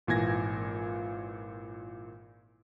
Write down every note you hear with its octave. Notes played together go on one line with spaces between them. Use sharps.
G#1 A#2 E3 G#5 G#6 A#6